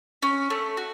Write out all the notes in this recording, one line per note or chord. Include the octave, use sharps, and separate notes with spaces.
C#4
A3
F#4